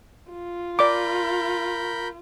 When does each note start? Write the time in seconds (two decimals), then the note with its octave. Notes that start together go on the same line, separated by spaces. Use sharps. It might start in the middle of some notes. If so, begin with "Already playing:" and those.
0.31 F4
0.79 A#4 D5 B5 D6 G6